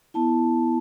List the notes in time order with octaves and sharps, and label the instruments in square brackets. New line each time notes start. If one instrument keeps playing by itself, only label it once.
[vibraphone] B3 E4 A5